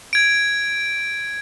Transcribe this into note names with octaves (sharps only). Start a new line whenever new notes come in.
G#6 D7